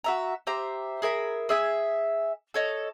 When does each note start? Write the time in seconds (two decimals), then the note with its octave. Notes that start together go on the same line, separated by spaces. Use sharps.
0.04 F#4 E5 A#5
0.47 G4 C5 E5 A#5
1.02 G#4 A#4 E5 B5
1.49 G#4 E5 G#5
2.54 A4 C#5 D#5